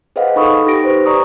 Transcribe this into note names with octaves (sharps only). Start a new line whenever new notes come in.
G#4 B4 C5 D#5 F5 F#5
D#4 A4 B5 C#6 D#6
D#4 G4 G5 A#6 D7
G4 B4 C5
D5 A#5 C#6 D#6